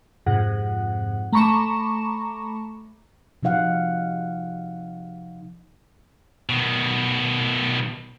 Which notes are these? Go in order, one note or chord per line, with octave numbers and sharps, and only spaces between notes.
F2 G#2 C3 F#5
A3 A#5 B5 C#6 D6 E7
C3 F3 D#4 F5 F#5
B2 D#3